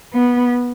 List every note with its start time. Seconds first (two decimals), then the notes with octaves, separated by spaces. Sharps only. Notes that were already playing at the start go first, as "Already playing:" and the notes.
0.14 B3